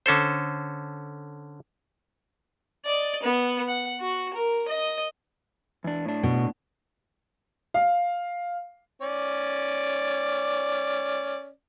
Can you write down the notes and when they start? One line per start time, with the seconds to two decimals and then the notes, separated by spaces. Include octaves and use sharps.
0.06 D3 C#4 A4 C5
2.86 D5 D#5
3.23 B3
3.68 F#5
4.00 F#4
4.34 A#4
4.68 D#5
5.84 E2 D4
6.05 A2 D4
6.23 B2
7.74 F5
9.02 C#4 D5